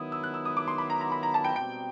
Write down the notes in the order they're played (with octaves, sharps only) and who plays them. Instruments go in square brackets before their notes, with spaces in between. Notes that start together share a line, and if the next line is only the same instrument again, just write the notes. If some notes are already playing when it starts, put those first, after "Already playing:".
Already playing: [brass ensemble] D#3 F#3 B3 E4 [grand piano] D#6
[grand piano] E6
F#6
E6
D#6
D6
C6
B5
A#5
A#5
B5
A#5
A5
G5
[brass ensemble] B2 G3 C4 [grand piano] G5